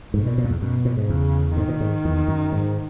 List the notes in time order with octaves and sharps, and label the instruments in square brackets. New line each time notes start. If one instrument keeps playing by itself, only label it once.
[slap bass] G#2 [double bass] B2
[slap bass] A#2
A#2
F#2
E2
[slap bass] F#2 [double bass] B2
[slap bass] A#2
G#2
[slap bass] E2 [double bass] C#3
[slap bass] G#2 [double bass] D#3
[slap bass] A#2
G#2
E2
F#2
G#2